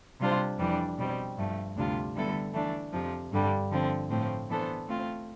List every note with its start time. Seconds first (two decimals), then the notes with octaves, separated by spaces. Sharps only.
0.20 C3 G3 D4 F4 C5
0.59 F2 E3 G3 D4
0.98 B2 G3 C4
1.37 G2 F3 A3
1.76 D2 C3 G3 D4 F4
2.15 D3 G3 B3 E4 A4
2.54 E3 A3 D4
2.93 F2 C3 F3
3.32 G2 D3 G3
3.71 D3 F3 C4
4.10 A2 F3 C4
4.49 E3 B3 D4 A4 C5
4.88 A3 C4 F4